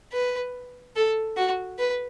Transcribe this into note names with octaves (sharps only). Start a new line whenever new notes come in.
B4
A4
F#4
B4